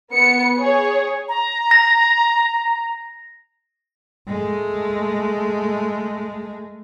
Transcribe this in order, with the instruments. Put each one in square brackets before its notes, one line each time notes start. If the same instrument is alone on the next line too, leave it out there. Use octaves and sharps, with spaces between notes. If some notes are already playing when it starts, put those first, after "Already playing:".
[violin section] B3 C#7
G#4 C#5
[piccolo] A#5
[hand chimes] A#6
[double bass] G#3 A3